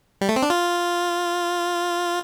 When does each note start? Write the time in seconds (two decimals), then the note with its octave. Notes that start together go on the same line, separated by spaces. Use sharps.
0.21 G3
0.29 A3
0.36 C4
0.43 D4
0.50 F4